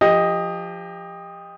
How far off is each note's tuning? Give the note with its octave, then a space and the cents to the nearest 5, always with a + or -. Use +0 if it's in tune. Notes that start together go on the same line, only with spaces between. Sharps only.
F3 -5 G4 +25 D#5 +0